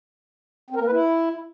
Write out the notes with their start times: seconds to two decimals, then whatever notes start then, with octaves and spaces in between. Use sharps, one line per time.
0.70 C4
0.76 A#4
0.81 A#3
0.86 B4
0.92 E4